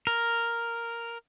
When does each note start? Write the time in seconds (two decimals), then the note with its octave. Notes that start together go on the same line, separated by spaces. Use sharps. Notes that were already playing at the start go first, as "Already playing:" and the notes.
0.07 A#4